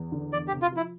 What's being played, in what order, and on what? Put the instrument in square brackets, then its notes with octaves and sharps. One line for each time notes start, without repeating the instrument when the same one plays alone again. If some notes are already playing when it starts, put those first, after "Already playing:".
Already playing: [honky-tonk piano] E2
D3
[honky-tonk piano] E2 [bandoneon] D5
[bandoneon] G4
[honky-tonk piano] C3
[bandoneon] F4
[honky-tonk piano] F3 [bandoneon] E4